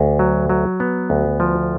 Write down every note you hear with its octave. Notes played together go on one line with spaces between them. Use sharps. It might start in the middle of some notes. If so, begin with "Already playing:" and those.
Already playing: D2
F#3
F#3
B3
D2
F3